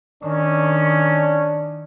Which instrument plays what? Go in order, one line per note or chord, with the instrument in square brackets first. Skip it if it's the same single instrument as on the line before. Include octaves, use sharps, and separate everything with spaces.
[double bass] D#3 [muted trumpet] C#4 [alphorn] D4